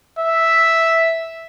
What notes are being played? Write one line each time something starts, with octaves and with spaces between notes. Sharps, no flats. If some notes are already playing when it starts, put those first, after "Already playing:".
E5